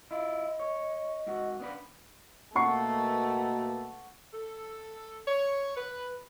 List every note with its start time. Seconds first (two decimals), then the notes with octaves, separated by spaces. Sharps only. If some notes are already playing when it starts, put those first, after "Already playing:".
0.11 E4 F4 D#5
0.60 C#5
1.27 G#2 F#4
1.59 B3 D4 B4
2.55 B2 A3 A#3 F#5 C#6 C7
4.33 A4
5.28 C#5
5.76 B4